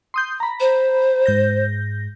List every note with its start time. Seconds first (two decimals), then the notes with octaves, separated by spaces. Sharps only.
0.14 C6 D#6 G6
0.40 A#5 B5
0.60 C5
1.26 G#2 G6 A#6